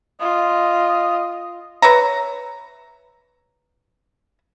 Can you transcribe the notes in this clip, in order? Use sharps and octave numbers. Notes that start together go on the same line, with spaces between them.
F4 D#5
B4 C#5 E5 A#5